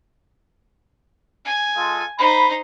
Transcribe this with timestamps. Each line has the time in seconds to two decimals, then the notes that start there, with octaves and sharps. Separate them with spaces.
1.45 G#5
1.75 G#3 F4 A4
2.18 D#4 C5 B5